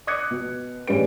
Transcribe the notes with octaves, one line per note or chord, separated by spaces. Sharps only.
D6 D#6 F#6 G#6 C#7
B2
A1 G3 C#4 G#4 B4 D7